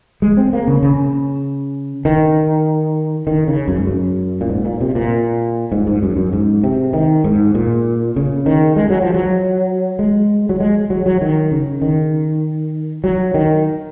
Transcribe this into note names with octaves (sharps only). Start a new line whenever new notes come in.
G#3
C4
A#3
C#3
C#3
D#3
D#3
C#3
F#2
G#2
F#2
A#2
G#2
A#2
C3
A#2
G#2
G#2
F#2
F#2
G#2
C3
D#3
G#2
A#2
C#3
D#3
G#3
F#3
F3
F#3
G#3
F#3
G#3
F#3
F#3
D#3
C#3
D#3
F#3
D#3